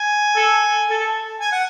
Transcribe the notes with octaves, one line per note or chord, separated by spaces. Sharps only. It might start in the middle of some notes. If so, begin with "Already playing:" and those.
Already playing: G#5
A4
A4
G#5
F#5